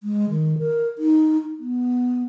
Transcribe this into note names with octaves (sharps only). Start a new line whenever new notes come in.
G#3
D#3
A#4
D#4
B3